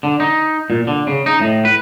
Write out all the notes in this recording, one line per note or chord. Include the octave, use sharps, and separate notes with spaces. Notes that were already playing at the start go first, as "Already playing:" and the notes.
D3
D#4
A#2
D3
C#3
D#4
A2
B4